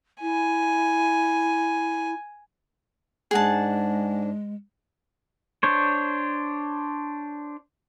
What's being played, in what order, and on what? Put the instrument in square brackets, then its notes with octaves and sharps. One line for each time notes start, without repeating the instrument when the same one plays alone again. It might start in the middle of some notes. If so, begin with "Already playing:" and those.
[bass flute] E4 [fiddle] G#5
[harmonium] G#2 D4 [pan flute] G#3 [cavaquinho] G#4 F#5 A5
[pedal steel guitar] D4 C5 C#5